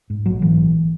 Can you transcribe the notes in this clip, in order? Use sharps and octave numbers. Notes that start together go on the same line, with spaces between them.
G#2
A#1 F#3
G#2 E3
A#1